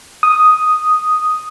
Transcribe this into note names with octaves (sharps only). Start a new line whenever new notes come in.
D#6